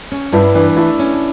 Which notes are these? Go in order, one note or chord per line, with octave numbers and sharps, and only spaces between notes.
C#4
G2 E4
E3 D4
A3 E4
C#4